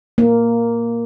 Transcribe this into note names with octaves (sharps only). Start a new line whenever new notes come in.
A#3